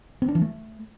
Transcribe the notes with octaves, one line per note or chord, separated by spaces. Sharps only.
C4
D4
E3
A3